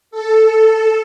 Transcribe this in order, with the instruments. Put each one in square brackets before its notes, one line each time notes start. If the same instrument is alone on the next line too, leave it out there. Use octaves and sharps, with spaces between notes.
[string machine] A4